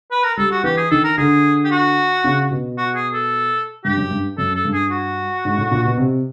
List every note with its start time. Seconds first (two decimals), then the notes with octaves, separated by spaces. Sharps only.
0.11 B4
0.24 A#4
0.37 G3 A4
0.51 F#4
0.64 E3 G4
0.77 G#4
0.91 D#3 A4
1.04 A#4
1.17 D3 G#4
1.65 G4
1.71 F#4
2.24 C#3
2.51 B2
2.78 F#4
2.95 G#4
3.13 A4
3.85 G2 G4
3.97 F#2
4.11 G2
4.38 F#2 A4
4.55 A4
4.65 G2
4.73 G#4
4.91 F#4
5.45 G#2
5.58 A2
5.71 A#2
5.85 B2
5.97 C3